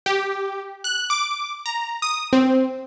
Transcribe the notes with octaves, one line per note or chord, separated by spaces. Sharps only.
G4
F#6
D6
A#5
D#6
C4